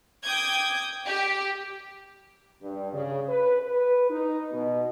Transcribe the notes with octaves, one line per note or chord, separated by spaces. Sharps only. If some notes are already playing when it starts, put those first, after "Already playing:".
G5 D6 D#6 G6 G#6
G4
G2
C#3
B4
B4
D#4
B2